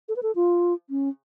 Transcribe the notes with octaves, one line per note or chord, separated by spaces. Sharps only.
A4
B4
A4
F4
C#4